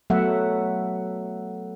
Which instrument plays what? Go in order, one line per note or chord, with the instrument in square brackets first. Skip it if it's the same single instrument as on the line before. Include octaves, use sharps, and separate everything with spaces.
[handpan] F#3 A3 B3 E5 F#5